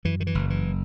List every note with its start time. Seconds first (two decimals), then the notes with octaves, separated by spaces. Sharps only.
0.05 F#2 E3
0.20 D#3
0.27 E3
0.35 F#1
0.50 E3